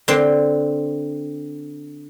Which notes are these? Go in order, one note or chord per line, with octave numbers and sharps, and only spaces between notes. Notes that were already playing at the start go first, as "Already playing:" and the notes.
D3 C4